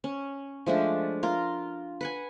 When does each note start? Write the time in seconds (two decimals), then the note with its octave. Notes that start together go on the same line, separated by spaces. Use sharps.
0.04 C#4
0.66 F3 G#3 A3 D4
1.23 F4 A#4
2.01 B4 F#5 G#5